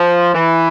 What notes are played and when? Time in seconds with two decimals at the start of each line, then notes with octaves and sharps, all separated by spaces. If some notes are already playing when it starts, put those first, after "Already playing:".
Already playing: F3
0.33 E3